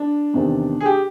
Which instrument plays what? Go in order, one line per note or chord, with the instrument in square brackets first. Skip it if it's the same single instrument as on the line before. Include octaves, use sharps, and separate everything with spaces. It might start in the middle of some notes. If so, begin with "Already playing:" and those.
Already playing: [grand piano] D4
[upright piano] E2 C3 D#3
[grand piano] G#4
G4